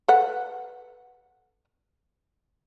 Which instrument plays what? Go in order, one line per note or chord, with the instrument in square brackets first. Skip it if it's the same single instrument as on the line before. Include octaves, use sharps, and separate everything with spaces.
[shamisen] A4 B4 F#5